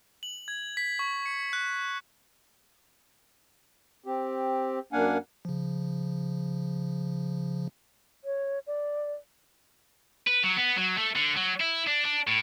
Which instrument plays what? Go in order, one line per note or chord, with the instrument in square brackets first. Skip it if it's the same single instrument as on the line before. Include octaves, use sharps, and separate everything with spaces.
[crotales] F#7
G#6
B6
C#6
C#7
F#6
[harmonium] C4 G4
F#2 A#3 D4 F5 F#5 G#5
[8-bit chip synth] C#3 F3
[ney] C#5
D5
[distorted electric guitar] B4
F#3
B3
F#3
A3
D3
F#3
E4
D4
D4
A2